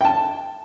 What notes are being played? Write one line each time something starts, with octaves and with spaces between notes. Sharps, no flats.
G5
A5